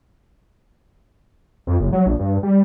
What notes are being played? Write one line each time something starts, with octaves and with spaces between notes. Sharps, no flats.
F2
F#1
F#3
A#1
G2
G3